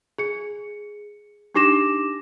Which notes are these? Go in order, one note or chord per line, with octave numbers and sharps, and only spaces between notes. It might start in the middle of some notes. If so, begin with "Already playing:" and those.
G#4 C#7
D4 D#4 G4 D6 A#6 E7